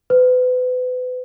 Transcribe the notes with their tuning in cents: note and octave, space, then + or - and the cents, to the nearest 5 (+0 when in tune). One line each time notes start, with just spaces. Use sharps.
B4 +35